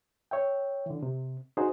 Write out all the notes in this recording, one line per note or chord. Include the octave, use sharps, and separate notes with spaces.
C#5 E5 G5
D3 E3
C3
D#4 F#4 G#4 C5